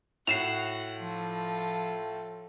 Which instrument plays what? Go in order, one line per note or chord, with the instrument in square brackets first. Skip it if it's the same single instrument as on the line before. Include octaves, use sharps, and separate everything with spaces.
[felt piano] A2 [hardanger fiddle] F#4 F#5 [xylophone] C7 E7 F7
[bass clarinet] F3 [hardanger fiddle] F4 A4